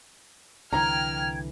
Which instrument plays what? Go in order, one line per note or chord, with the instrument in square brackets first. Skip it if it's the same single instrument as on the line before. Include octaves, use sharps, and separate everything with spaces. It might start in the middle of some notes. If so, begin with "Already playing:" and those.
[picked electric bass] C2 D3 E3 [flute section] G5 G#6 [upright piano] A#5 [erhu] F6